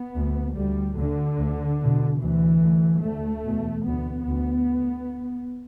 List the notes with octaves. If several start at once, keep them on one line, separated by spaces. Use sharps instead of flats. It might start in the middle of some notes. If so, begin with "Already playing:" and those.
Already playing: B3
D2
D2 G3
D2 D3
D2
E2 B2
D2 E3
D2
D2 A3
E2 B2
D2 B3
D2 B3
D2